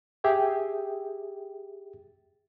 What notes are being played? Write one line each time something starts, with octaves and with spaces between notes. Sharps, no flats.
G4 G#4 E5 G5